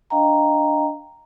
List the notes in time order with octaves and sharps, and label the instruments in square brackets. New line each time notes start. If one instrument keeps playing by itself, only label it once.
[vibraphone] D4 D#5 F5 G5 A#5